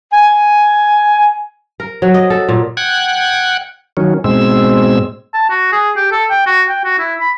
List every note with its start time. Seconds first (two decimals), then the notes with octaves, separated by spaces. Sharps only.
0.13 G#5
1.80 A#4
2.02 F#3
2.14 D#5
2.30 A4
2.49 A#2
2.77 F#5 G5 F#6 G#6
3.97 D#3 F#3 C#4
4.24 G#2 B2 G#3 C4 E6
5.34 A5
5.50 F#4
5.72 G#4
5.96 G4
6.12 A4
6.30 G5
6.46 F#4
6.69 G5
6.84 F#4
6.99 E4
7.20 B5